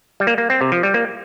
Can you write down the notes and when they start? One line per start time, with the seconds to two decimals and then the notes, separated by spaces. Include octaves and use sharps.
0.20 G3
0.27 A#3
0.38 A#3
0.50 C4
0.61 C3
0.72 F3
0.83 G3
0.94 A#3